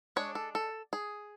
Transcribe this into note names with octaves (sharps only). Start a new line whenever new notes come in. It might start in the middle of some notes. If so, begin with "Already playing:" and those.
G#3 D4 C#5
A4
A4
G#4